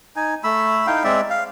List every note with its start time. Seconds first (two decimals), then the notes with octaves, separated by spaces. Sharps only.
0.16 D#4 G#5
0.44 A3 B5 E6
0.87 D#4 E4 F5 G5
1.04 G#3 C4 D5 E5
1.30 F5